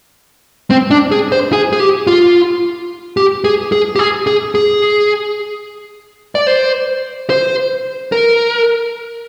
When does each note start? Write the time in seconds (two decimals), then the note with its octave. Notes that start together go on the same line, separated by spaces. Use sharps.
0.70 C4
0.91 D4
1.12 G#4
1.32 C5
1.53 G#4
1.73 G#4
1.80 G4
2.07 F4
3.17 G4
3.44 G#4
3.72 G#4
3.96 G4
3.99 G#4
4.27 G#4
4.55 G#4
6.35 D5
6.47 C5
7.30 C5
8.12 A#4